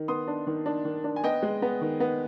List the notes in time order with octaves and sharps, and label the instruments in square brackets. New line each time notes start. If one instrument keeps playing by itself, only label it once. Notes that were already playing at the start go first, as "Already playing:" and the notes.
Already playing: [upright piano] D#3
B3 C6 D#6
D4
D#3
D4
D#3
D4
G#5
B3 D#5 G5
G#3
B3
D#3
B3